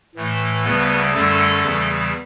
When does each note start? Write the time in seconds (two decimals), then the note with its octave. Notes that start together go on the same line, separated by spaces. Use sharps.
0.15 A2 E3 A3
0.64 D2 C#3 G3 B3 B4
1.14 F#2 D3 G3 A3 A4
1.63 E2 C#3 E3 G3